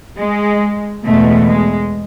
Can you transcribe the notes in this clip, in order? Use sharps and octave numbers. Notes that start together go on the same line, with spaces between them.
G#3
E2 B2 G#3 A3
G#3